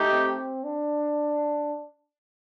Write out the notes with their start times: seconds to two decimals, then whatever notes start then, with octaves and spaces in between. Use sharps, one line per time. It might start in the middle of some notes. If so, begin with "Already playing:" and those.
Already playing: A3 D#4 G4
0.11 C4
0.64 D4